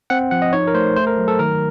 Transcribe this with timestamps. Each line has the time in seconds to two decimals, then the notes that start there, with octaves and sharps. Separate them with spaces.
0.10 C4 F#5
0.31 F3 F#5
0.42 D#5
0.53 D#4 C#5
0.67 A#4
0.74 A3 C5
0.96 A3 C5
1.07 A#4
1.18 F#3
1.28 A4
1.39 D#3 A#4